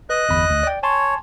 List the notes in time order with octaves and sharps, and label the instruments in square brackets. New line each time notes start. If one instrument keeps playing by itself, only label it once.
[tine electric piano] B4 [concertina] D#5 F#6
[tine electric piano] G1 E2 B5
D2
D5 G5
[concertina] C#5 [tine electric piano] G#5 A5 C6